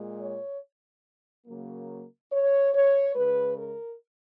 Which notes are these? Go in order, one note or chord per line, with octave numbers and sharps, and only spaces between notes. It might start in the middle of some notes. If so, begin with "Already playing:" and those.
Already playing: A#2 G#3
C#5
C#3 F#3 A#3
C#5
C#5
C#3 G#3 B4
A#4